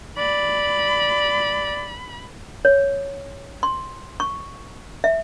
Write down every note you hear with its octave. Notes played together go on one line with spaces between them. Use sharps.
D5 B5
C#5
C6
C#6
E5